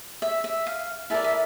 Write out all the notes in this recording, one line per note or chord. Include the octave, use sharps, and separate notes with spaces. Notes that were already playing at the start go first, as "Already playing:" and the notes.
E5
E5
F5
E4 A4 A#4 D5 A5
E5